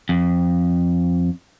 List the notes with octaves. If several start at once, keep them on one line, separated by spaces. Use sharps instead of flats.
F2